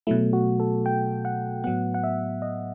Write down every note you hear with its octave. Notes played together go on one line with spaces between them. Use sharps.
B2 F#3 A3 E4
F#4
A4
G5
F#5
A2 F#3 B3 F#5
F#5
E5
D#5